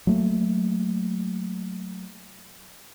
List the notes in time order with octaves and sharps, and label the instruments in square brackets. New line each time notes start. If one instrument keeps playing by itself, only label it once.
[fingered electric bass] F#3 A3 A#3